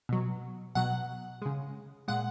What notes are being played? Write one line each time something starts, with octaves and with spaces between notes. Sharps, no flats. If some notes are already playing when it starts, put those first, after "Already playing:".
B2 F#3
B2 F#3 F#5
C#3 G#3
A#2 G#3 F#5